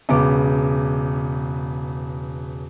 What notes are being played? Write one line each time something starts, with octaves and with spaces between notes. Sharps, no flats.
E1 C#3 B3 D6